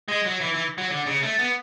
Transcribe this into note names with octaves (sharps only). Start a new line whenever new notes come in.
G#3
F#3
E3
E3
F#3
D3
C#3
A3
B3